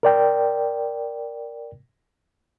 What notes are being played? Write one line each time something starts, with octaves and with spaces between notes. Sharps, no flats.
A#4 D5 G5